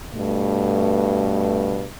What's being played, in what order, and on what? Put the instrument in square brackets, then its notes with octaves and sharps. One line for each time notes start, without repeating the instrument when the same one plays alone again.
[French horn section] G2 B2 A3